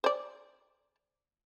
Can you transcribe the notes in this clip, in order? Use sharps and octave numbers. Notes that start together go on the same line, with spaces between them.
C5 D5